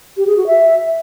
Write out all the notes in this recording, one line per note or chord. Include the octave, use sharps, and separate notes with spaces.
G4
G#4
F#4
E5